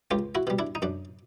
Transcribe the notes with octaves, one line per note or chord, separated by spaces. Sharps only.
C#2 F4 G4
E4 F#4
B2 G3
D4 E4
D#4
F#2 D4